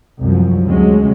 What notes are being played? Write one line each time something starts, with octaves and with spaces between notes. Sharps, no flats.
C2 F#2 F3
D2 C3 F#3 G#3 C#4